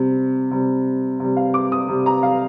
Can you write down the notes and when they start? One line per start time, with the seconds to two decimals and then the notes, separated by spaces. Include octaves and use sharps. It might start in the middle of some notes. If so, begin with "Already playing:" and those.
Already playing: C3 G3
0.51 C3 G3
1.20 C3 G3
1.37 F5
1.54 D6
1.72 D#6
1.88 C3 G3
2.06 A#5
2.23 F5